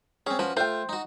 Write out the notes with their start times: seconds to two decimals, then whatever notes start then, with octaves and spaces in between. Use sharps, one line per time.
0.26 C4 C#4 G#4
0.39 F3 C#4 F#4 B4
0.57 A3 F4 C5 G5
0.89 D#4 F#4